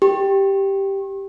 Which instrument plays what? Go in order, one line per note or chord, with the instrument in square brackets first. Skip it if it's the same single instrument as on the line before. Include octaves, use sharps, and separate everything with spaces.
[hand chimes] G4